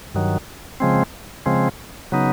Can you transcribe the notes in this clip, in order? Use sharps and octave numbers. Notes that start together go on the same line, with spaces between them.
G2 D#3 F#3
C#3 F3 G#3 C4
C#3 F3 G#3 C4
C#3 F#3 B3 D#4